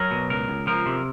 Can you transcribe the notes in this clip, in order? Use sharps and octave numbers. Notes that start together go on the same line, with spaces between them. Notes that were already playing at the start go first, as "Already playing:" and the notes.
Already playing: F#3 A#4
B2
C#2 A#4
C#2
F3 A#4
C3